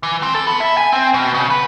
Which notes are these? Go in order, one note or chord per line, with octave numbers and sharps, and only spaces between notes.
E3
C4
A4
B3
E5
G#5
C4
B2
C#3
B4